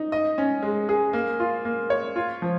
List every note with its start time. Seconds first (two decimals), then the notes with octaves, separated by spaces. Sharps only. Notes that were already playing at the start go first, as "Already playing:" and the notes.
Already playing: D#4
0.12 D#5
0.38 C#4
0.63 G#3
0.89 G#4
1.13 A#3
1.40 F4
1.65 A#3
1.90 C#5
2.16 F4
2.42 F3